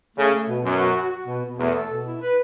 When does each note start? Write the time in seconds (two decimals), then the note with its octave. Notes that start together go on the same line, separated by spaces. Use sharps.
0.17 C#3 A3
0.32 A3
0.48 B2
0.64 F#2 B2
0.79 F#4
0.95 F#4
1.11 F#4
1.27 B2
1.43 B2
1.58 E2 A3
1.73 A4
1.89 B2
2.05 E4
2.21 B4